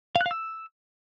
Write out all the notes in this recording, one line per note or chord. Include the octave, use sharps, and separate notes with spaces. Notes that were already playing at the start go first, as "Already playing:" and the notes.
F5
F#6
F5
E6